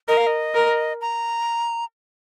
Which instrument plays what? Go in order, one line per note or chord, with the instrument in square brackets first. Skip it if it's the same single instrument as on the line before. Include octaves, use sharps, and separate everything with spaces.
[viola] A#4 [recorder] D#5
[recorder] F5
D#5
[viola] A#4
[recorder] A#5